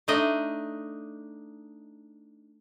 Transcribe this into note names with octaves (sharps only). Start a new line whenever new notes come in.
A3 D4 D#4 D#5